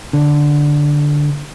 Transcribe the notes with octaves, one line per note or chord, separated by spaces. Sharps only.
D3